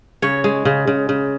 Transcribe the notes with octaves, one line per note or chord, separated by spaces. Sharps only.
C#3 C#5
G#3
C#3
C#3
C#3